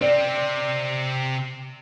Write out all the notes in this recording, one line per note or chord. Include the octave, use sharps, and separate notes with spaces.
C3 C4 D5